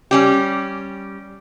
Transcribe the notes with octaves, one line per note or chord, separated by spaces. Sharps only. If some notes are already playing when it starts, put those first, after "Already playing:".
G3 C#4 G4